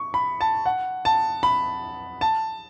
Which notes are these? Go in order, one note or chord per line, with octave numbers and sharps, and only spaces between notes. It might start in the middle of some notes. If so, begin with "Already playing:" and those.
Already playing: C#6
B5
A5
F#5
A5
B5
A5